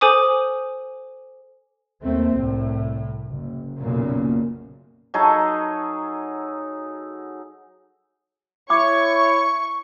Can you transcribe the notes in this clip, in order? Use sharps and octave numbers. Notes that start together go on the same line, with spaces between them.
A4 C5 G#5 D6 D#6
D#2 A3 C4
C2 A2
F#1
B1 F#2 A#2 C#3 A#3
F#3 D#4 G#4 A4
E4 C#5 C#6 D6